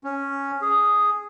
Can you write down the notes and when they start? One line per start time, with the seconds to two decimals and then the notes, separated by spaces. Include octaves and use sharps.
0.04 C#4
0.62 G#4